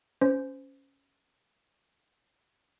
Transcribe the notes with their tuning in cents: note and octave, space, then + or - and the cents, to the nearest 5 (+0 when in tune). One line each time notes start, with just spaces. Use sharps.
C#4 +0 C5 -20